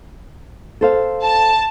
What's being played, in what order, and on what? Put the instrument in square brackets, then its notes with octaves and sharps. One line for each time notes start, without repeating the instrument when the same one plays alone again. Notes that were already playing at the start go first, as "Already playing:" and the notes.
[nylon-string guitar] A4 C5 F5
[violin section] A5